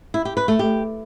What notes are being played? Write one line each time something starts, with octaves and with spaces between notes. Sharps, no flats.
E4
G4
B4
A3
G4